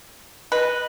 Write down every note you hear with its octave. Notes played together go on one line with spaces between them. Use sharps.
B4 D#5